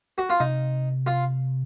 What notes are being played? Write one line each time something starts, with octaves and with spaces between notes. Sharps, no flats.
F#4
F4
C3 D#4
F4